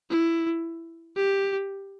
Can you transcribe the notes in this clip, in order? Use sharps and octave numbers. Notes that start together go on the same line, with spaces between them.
E4
G4